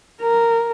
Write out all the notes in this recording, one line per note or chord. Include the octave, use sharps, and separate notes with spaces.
A#4